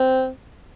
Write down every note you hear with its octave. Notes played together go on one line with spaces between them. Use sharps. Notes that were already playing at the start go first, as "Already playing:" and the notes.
Already playing: C4